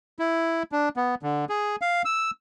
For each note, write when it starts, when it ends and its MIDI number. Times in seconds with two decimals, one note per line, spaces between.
0.19 0.63 64
0.72 0.89 62
0.97 1.15 59
1.23 1.45 50
1.49 1.76 68
1.81 2.02 77
2.05 2.31 88